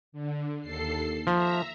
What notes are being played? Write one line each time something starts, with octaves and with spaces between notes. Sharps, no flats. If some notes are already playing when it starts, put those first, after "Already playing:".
D3
D#2 A4 C7
F3 E5 A#5